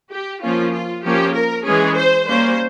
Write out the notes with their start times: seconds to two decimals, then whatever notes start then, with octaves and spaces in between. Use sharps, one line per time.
0.11 G4
0.42 F3 A#3 C#4 F4
0.73 F4
1.04 F3 A#3 C#4 G4
1.35 A#4
1.66 E3 G#3 C#4 G#4
1.96 C5
2.28 G3 A#3 C#4 C5